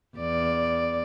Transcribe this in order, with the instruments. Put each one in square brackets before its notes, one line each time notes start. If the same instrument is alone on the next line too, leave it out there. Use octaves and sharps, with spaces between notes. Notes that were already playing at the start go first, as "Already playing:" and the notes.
[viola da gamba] E2 D5